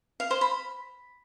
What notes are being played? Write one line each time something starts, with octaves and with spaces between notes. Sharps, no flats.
F5
C5
B5